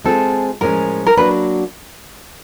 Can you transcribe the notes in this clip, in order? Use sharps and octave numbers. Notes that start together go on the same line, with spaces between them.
G#3 C4 F4 G#4 A4
A2 F3 G#3 C#4 A#4
A#4
F#3 A#3 D4 F#4 B4